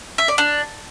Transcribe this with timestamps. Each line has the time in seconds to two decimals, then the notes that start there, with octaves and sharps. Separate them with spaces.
0.18 E5
0.28 D5
0.38 D4